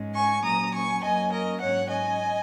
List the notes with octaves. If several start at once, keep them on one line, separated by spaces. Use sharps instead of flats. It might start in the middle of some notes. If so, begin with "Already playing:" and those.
Already playing: G#2 G#3 C#4
G#5 C#6
A#2 F#3 C#4 A#5 D#6
G#5 C#6
F#2 F#3 A#3 C#4 D#5 G#5
A#4 D#5
G#2 F#3 C#4 C#5 F#5
D#5 G#5